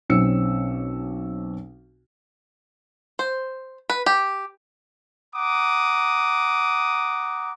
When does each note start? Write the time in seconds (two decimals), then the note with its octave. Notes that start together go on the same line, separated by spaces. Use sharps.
0.10 B1 C4 C#4 E6 C#7
3.19 C5
3.90 B4
4.06 G4
5.35 F#5 A#5 D6 D#6